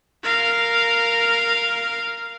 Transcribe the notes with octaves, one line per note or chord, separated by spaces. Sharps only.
A#4 F5